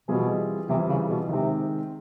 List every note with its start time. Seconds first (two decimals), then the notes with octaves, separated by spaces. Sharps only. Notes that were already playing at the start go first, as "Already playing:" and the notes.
0.08 B2 E3 G3 C4 F4 G#4
0.69 C3 E3 G3 C4 F4 G#4
0.89 C#3
1.10 B2
1.29 C3 D#3 G#3 C4